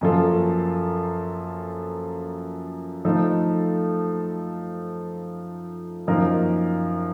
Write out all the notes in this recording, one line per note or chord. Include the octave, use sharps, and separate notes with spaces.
F#2 F3 A#3 F4 A4
F3 A3 D#4 A4
F#2 F3 A#3 D#4 A#4